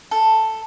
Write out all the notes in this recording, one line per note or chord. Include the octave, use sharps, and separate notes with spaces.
A4